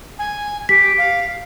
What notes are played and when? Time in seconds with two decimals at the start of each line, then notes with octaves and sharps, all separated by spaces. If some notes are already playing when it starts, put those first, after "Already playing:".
0.19 G#5
0.69 G4 B6
0.98 F5